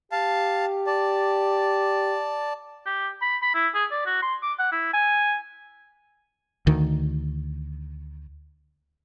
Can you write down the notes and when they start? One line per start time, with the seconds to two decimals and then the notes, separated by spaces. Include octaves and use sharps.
0.12 G4 F5 A5
0.87 D5 A5
2.86 G4
3.22 B5
3.43 B5
3.55 E4
3.75 G#4
3.91 D5
4.06 F#4
4.22 C6
4.43 D6
4.59 F#5
4.72 E4
4.94 G#5
6.67 D2 D#3